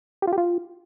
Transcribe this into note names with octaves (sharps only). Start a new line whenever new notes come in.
G4
F4
G4
F4